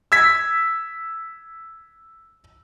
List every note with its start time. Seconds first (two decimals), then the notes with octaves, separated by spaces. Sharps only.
0.12 E6 G#6 B6